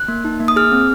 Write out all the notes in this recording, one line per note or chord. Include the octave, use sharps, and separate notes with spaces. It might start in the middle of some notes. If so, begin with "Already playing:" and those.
Already playing: F#6
A#3
D#4
A#3
D#6
G#4 F6
C4